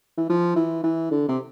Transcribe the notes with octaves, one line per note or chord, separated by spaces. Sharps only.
E3
F3
E3
E3
D3
C3